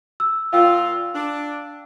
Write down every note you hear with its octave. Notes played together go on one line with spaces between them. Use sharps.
E6
A#2 F4 F5 G5 E6
D4